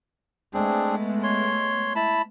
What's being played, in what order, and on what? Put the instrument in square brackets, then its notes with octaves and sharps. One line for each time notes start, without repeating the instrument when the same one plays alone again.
[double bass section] G#3 A3 B3 [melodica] C4 D4 G#4
[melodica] C#5 C6
E4 A5 B5